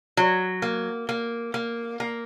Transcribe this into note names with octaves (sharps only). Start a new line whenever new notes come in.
F#3
A#3
A#3
A#3
A#3